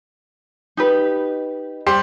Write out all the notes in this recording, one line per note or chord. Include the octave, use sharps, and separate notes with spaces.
D#4 G4 B4
G3 G4 C5